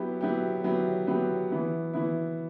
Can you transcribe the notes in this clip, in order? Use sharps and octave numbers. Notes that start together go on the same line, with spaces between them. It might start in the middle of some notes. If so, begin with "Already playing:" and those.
Already playing: F#3 B3 E4 G4
F#3 B3 E4 G4
F#3 B3 E4 G4
F#3 B3 E4 G4
E3 B3 E4
E3 B3 E4